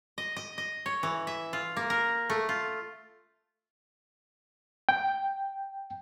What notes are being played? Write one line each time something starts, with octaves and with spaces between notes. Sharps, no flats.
D#5
D#5
D#5
C#5
E3
E5
F4
A#3
A#4
A3
F4
G5